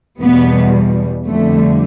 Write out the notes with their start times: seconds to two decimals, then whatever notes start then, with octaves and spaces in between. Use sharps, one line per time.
0.20 E2 B2 G3 B3
1.26 F2 D3 G3 A3